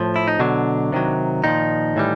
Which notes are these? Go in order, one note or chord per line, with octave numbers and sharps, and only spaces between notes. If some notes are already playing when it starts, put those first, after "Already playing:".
Already playing: A2 F3
E4
D#4
B2 D3 F#3 D4
C3 D#3 F#3
A#2 D#3 F3 D#4
A2 E3 G3